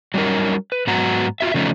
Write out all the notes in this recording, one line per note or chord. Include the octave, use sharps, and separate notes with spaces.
F#3 G3 C#4 D#4 A#4
B4
G#2 F#3 B3 F#4 A#5
F4 F#4 E5
C#3 F3 A3 C#4 D#4